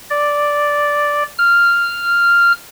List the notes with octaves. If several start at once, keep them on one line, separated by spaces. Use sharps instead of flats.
D5
F6